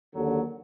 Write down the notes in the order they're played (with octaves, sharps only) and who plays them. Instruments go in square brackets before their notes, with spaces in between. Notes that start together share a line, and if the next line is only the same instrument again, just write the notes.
[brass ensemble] D#2 D3 F#3